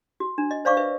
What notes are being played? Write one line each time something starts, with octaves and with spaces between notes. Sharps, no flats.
F#4
D4
D#5
C5 D5 F5 C#6 D6
B4 E5